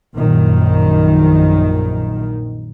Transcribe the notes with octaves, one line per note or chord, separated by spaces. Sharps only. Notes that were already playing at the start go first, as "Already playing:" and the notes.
A#1 F#2 D#3